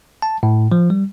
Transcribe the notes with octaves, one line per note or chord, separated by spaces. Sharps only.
A5
A2
F3
G3